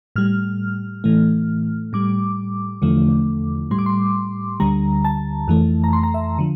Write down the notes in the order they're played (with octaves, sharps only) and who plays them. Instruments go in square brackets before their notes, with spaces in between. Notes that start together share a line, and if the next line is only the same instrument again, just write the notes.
[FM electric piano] A2 G3 F6
A2 E3 A3
A2 G3 D6
E2 D3 F3 A3
A2 G3 C6
D6
C6
D2 D3 G3 A#5
A5
F2 E3 A3
A#5
C6
A#5
E5
D3 F3